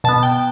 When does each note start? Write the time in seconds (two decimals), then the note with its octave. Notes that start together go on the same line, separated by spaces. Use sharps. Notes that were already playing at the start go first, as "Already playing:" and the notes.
0.04 B2 B3 A5
0.23 G5